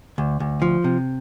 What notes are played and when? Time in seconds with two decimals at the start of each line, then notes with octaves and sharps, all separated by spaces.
0.18 D2
0.40 D2
0.62 F3
0.84 C3